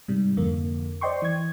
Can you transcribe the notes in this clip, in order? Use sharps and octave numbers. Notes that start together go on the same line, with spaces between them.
G#2 C3 G3
F2 D3 A#3
C5 D5 D#5 G5 C6 C#6
E3 G#6